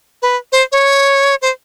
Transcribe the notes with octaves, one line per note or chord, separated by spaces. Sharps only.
B4
C5
C#5
C5